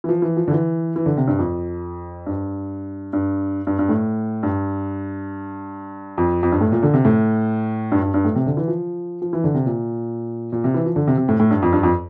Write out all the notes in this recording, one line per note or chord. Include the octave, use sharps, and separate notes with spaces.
E3
F3
E3
F3
D3
E3
E3
D3
C3
G2
F2
G2
G2
G2
G2
A2
G2
F2
F2
G2
A2
A#2
D3
C3
A2
G2
G2
G2
A2
C3
D3
E3
F3
F3
E3
D3
C3
A#2
A#2
C3
E3
F3
D3
C3
C3
A2
A2
G2
F2
G2
F2